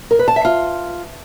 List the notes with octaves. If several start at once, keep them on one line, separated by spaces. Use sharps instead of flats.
A#4
B4
A5
E5
F4